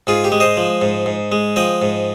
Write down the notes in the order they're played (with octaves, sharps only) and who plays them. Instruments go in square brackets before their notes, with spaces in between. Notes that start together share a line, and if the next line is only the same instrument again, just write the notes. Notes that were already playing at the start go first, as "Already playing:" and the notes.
[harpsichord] G#2 F4 G#4
G4
G#3
C5 D#5
F3
G#2
G#2
G#3
F3 D#5 G5
G#2